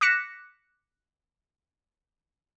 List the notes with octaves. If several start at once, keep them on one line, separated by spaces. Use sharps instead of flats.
D6 F#6 A#6 B6 C#7 E7